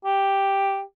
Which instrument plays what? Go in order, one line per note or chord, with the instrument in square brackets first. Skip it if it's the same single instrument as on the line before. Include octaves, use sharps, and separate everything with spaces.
[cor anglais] G4